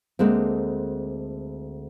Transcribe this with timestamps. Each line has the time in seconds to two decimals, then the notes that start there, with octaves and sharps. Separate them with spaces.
0.19 D2 G#3 A#3 C4